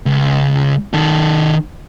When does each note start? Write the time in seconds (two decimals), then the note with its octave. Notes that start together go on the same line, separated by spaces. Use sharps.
0.06 C#2
0.94 D#3 A4